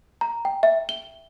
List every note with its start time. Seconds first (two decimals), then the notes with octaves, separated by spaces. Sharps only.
0.21 A#5
0.45 G5
0.63 E5
0.89 G7